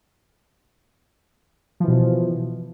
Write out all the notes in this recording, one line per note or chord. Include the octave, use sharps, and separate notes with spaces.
B2 E3 F3